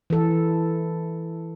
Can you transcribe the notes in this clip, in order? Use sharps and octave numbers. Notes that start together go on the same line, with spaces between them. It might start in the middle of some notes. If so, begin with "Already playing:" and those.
E3 A4